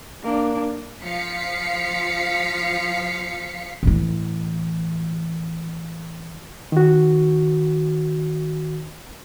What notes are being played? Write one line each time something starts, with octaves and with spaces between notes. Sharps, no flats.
A#3 D4
F3 F5 B6 C#7
A2 E3
D#3 F#4